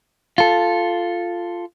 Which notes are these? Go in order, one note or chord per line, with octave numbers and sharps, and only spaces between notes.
F4 A4